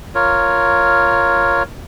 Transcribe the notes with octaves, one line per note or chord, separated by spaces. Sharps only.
F4 A#4 C#5